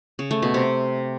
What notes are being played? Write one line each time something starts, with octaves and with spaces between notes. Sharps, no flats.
C#3
A3
B2
C3